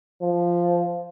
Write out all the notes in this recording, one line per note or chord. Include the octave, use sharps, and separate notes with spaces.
F3